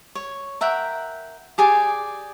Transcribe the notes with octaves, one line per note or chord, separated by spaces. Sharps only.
C#5
A#4 E5 F#5 G5
G4 G#4 D5 G#5